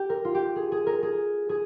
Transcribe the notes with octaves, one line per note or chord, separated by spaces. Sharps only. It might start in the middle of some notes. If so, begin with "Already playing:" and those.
Already playing: G4
A#4
F4
G4
G#4
G#4
A#4
G#4
G#4